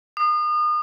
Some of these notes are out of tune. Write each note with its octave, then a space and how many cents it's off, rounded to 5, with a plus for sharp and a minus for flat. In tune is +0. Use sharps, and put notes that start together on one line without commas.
D#6 -35